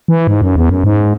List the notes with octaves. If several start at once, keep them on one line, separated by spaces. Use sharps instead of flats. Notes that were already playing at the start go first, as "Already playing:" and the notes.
E3
G#2
F#2
E2
F#2
G#2